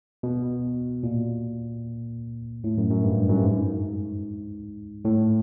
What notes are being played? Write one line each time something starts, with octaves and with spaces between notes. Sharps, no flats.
B2
A#2
A2
F#2
F#2
G2
F#2
G2
G#2
A2